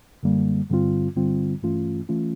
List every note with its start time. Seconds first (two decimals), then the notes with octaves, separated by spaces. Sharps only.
0.23 F#2 D3 G3 A#3
0.70 G2 D3 G3 C4 F4
1.16 G2 D3 G3 C4 F4
1.62 G2 E3 A3 C#4 F4
2.09 E3 A3 C#4 F4